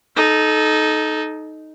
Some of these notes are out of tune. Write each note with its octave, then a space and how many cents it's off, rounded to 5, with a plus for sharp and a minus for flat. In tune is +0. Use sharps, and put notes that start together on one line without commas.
D#4 +0 A4 -25